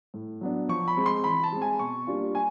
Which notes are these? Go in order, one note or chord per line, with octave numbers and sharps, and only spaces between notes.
A2
F#3 B3 D4
F3 C#6
B5
G#3 C4
C6
E3 B5
A5
G#3 C4
G#5
B2 C#6
G3 A#3 D4 F4
G#5